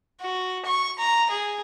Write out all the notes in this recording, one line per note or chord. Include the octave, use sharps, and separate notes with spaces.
F#4
C#6
A#5
G#4